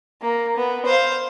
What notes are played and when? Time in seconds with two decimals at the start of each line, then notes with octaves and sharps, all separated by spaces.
0.22 A#3
0.56 B3
0.86 C5 F5